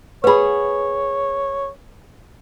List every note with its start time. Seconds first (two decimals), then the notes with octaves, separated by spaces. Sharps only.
0.24 B3 G#4 B4 C#5 B5